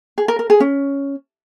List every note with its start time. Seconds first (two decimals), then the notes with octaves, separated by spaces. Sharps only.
0.18 G#4
0.28 A#4
0.39 A#4
0.50 G#4
0.60 C#4